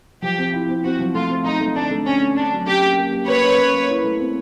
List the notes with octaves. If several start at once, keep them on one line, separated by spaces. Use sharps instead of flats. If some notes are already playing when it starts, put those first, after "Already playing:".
F3 G4
C4
E4
C4
C4 F#4
F3
A3 F4
C4
A3 D#4
A3
D3 D4
A3
D3 C#4
A3
D3 D4
F#3
C#4 G4
A#3
A#3
A#3
A#3 B4 C#5
C#4
A#3
A#3
E4
A3
C4